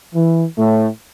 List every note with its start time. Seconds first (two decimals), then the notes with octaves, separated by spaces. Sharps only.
0.14 E3
0.57 A2 A3